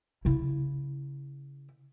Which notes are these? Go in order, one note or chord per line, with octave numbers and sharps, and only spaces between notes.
C#3 E4